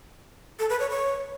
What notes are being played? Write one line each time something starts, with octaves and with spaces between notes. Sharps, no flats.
A4
B4
C#5
C#5